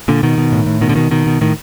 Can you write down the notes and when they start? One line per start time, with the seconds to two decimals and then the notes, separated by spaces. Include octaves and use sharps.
0.08 A#2 D3
0.23 B2 D#3
0.38 B2
0.52 A2
0.66 A2
0.81 B2 D#3
0.89 D3
0.96 B2 D#3
1.11 B2 D#3
1.26 B2
1.41 A2 D#3